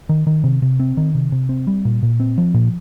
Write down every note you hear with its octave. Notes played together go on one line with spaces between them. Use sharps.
D#3
D#3
C3
C3
C4
D#3
C3
C3
C4
G3
A#2
A#2
C4
F3
A#2